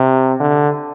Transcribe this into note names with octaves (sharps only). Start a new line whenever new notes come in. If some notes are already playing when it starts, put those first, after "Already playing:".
Already playing: C3
D3